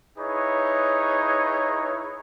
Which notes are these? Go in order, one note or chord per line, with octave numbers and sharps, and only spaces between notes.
D#4 E4 G#4 B4 C#5